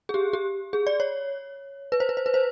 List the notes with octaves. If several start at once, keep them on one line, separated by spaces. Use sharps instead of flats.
G#4
G4
G4
G#4
D5
C#5
B4
C5
B4
C5
B4
C5